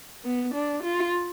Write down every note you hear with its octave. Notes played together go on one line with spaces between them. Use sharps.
B3
D4
F4